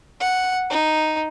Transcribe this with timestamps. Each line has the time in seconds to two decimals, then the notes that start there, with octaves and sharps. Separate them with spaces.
0.20 F#5
0.70 D#4